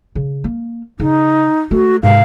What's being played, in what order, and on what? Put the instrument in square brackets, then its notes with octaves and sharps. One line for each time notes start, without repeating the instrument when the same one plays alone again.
[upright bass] C#3
A#3
[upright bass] C#3 [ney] D#4
[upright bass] A3 [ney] F#4
[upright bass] G#2 C3 [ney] F5